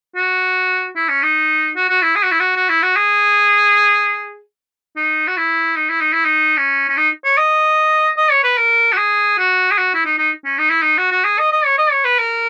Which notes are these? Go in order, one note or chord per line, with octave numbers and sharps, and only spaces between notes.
F#4
E4
C#4
D#4
F#4
F#4
E4
G#4
F#4
E4
F#4
F#4
E4
F#4
G#4
D#4
F#4
E4
D#4
E4
D#4
E4
D#4
C#4
C#4
D#4
C#5
D#5
D#5
C#5
B4
A#4
F#4
G#4
F#4
G#4
F#4
E4
D#4
D#4
C#4
D#4
E4
D#4
F#4
F#4
G#4
D#5
D#5
C#5
D#5
C#5
B4
A#4